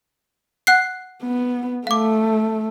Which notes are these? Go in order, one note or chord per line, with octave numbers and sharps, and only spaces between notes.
F#5 F#6 C7
B3
A3 F5 D6